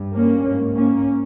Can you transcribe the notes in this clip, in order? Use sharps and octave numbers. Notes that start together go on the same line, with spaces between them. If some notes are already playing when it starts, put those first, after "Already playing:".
Already playing: G2
A#3 C#4
G#2
A#3 C#4